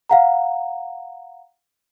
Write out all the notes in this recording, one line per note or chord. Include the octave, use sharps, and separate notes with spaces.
F5 F#5 A#5